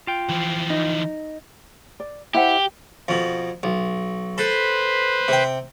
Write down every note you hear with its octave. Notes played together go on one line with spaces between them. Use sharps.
F4 G5
E3 F3
D#4
D5
E4 G4 C5 F#5
F2 B2
B1
A4 B4 C5
C3 G5